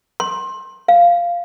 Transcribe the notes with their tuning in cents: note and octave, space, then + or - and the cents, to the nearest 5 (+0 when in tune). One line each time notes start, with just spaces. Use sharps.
C6 +25
F5 -5